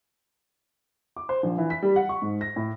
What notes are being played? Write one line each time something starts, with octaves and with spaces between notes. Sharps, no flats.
D6
C5
A#1
E3
B6
G3
F#5
C#6
G#2
A#6
A2